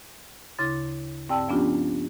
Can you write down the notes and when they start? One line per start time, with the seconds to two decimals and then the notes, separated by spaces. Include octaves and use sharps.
0.59 D2 C#3 E4 C6 D6 A6
1.29 G2 C4 D5 G5 A5 E6
1.48 F3 B3 C#4 D4 F4 G4